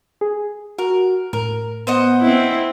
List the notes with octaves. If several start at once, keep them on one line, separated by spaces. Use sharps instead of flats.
G#4
F#4 A#4
A2 A#4
B3 C5 D#5 F#5
C4 E4